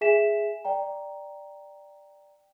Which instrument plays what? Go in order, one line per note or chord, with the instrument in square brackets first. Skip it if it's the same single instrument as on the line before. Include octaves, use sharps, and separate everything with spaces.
[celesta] G#4 E5 G#5 B6 E7
D5 G5 A#5